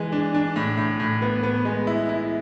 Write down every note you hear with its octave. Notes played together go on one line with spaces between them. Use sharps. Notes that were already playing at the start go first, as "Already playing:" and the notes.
Already playing: E3 G#3
D4
D4
A2
A2
A2
B3
B3
G#3
E4
E4